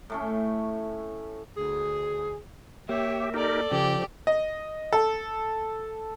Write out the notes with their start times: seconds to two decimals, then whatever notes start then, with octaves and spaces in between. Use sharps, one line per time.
0.10 A2 A3 C#4
1.56 D2 G#4
2.89 A#3 G4 C#5 E5
3.34 D#4 G4 A4 A#4 D5
3.71 C#3 F3 G4
4.27 D#5
4.93 A4